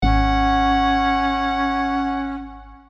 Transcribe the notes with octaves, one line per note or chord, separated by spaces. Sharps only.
G#1 C#4 F#5